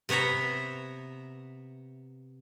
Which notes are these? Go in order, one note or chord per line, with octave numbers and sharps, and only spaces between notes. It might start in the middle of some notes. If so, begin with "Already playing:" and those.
C3 B3 C#5 E5 A#5